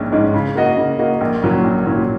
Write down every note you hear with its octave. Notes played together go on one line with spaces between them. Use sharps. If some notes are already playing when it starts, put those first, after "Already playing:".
Already playing: A#1 G#2 G#3 C#4
G#2 G#3 C#4
C#3
A#3 F#4 D#5
C#3
A#3 F#4 D#5
A#1
A#2 F#3 C#4
A#1
A#2 F#3 C#4